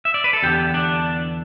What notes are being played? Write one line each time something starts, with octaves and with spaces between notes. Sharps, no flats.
E5
D5
B4
A4
E2 D3 B3 G4
D4